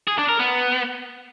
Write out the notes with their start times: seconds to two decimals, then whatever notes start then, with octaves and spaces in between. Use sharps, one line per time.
0.08 G#4
0.18 D4
0.29 A#4
0.39 B3